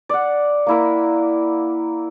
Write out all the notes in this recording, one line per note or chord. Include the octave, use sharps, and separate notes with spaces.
D5 F#5
A#3 E4 A#4